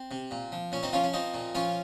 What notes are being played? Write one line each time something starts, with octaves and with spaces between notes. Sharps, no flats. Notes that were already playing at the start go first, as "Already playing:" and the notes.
Already playing: C4
C3
A#2
F3
A#2 C#4
C4 D#4
F3 C#4 F4
C#4
F3 C4 D#4
A#2
F3 C#4 F4